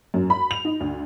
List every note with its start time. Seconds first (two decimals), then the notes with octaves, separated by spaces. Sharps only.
0.14 F#2
0.30 B5
0.51 F7
0.65 D#4
0.80 D2